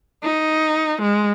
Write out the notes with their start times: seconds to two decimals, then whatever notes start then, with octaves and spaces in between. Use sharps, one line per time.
0.23 D#4
1.02 G#3